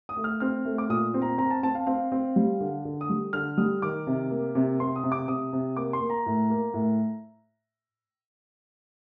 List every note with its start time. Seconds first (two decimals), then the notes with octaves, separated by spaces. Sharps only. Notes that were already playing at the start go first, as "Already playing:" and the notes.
0.09 D#6
0.17 A3
0.24 F6
0.40 C4 F6
0.65 A3
0.78 D6
0.89 A#2 D#6
1.14 C4
1.22 A#5
1.38 C4 A#5
1.51 A5
1.63 C4 A5
1.75 F5
1.87 C4 F5
2.12 C4
2.36 G3
2.61 D3
2.85 D3
3.01 D#6
3.10 G3
3.33 D3 F6
3.58 G3 D#6
3.82 D#3 D6
4.07 C3
4.30 A#3
4.55 C3
4.80 C3 C6
4.96 D#6
5.04 C3
5.12 D6
5.28 C3 D#6
5.53 C3
5.77 A#3 D6
5.93 C6
6.01 A#3
6.10 A#5
6.26 A2
6.50 A#3
6.74 A2